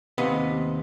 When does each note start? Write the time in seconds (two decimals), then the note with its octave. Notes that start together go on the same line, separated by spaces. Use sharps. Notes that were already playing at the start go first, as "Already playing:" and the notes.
0.18 D#2 C3 B3 D#5